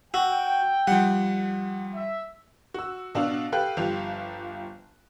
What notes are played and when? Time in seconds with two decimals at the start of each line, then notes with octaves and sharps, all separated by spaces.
0.14 F#4 G5 E6
0.87 F3 G3 F#5
1.95 E5
2.74 F#4 E6
3.15 B2 D4 F#4 F5 E6 F7
3.52 G4 A4 B4 F5 G5 F#6
3.77 G1 F3 G4 F5 F7